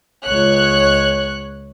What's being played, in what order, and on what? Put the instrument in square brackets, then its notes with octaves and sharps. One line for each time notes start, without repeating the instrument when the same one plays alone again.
[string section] C#2 C#5 F#6